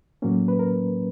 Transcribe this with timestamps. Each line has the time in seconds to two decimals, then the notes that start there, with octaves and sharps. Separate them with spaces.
0.22 A2 F#3 A#3 C#4
0.48 B4
0.59 A#4